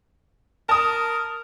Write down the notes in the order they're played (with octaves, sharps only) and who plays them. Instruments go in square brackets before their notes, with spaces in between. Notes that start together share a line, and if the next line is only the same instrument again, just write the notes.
[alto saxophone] A#4 [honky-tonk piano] A5 D#6